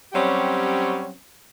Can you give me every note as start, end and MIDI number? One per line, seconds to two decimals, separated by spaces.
0.13 1.12 54
0.13 1.12 55
0.13 1.12 60
0.13 1.12 61
0.13 1.12 67